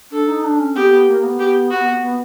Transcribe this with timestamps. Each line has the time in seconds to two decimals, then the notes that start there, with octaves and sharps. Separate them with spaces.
0.12 D4 A4
0.28 D#4
0.44 D4
0.60 C#4
0.76 B3 G4
0.91 B3
1.08 A#3
1.23 B3
1.40 G4
1.71 F#4
2.02 B3